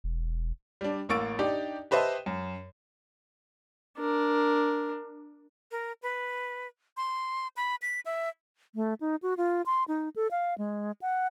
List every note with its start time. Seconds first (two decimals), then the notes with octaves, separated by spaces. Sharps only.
0.04 E1
0.81 G3 D4
1.09 A1 A#3 C#6 E6 A6 D7
1.39 D4 D#4 G4 D5
1.91 G4 B4 C5 D#5 E5 A5
2.26 F#2
3.99 D4 A#4
5.71 A#4
6.02 B4
6.97 C6
7.57 B5
7.82 B6
8.06 E5
8.75 A3
9.01 D#4
9.23 F#4
9.37 F4
9.66 C6
9.88 D#4
10.16 A4
10.31 F5
10.58 G#3
11.02 F#5